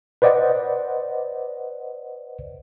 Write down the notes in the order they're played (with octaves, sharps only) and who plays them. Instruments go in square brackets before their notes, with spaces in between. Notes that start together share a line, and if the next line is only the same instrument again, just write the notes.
[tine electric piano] B4 C5 D5 D#5 F#5